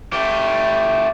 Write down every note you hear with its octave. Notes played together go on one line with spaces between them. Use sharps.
A3 G4